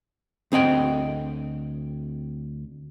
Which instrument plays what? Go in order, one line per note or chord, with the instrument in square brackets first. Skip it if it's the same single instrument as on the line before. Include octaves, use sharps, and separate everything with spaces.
[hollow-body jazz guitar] D2 C4 D#5 G5